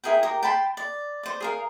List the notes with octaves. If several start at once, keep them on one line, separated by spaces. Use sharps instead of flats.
E4 G#4 A#4 G5
G4 A#4
G5 A5 B5 C6
D5
C5 D5
G#4 A#4 F5